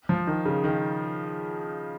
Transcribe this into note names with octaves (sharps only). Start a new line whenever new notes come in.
F3
D#3
C#3
D#3